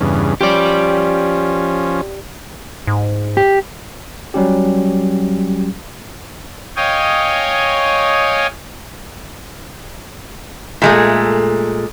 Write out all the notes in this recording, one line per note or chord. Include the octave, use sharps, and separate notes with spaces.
E2 G2 C#3
F3 C#4 G4 D5
G#2
G4
F#3 G3 C#4 G4
C#5 D#5 F5 G5 G#5
A#2 G#3 A3